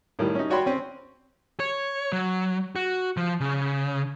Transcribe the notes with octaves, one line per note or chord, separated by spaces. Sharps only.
A2 D#3 G3
C#4 D#4
F#4 C#5 D5 G5 B5 C6
C4 C#4
C#5
F#3
F#4
F3
C#3